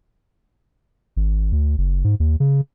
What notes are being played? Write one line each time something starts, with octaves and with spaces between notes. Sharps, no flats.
G#1
D2
F#1
G#2
D#2
C#3